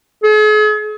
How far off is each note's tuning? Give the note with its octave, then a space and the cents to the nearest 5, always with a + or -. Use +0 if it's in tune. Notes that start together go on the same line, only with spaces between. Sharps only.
G#4 +45